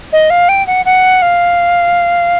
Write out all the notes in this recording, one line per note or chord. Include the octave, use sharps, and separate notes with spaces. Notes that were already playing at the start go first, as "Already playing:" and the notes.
D#5
F5
G5
F#5
F#5
F5